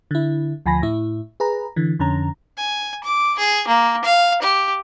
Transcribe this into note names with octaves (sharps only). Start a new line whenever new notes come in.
D3 E4
D2 F3 G#5 B5 A#6
A2 E4
G#4 B4 A#5
D3 E3
F2 D3 C#4 A#5
G#5
D6
G#4
A#3
F5
G4